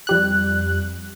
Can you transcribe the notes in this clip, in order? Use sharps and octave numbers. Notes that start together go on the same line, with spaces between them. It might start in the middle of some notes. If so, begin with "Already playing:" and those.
F2 G3 F#6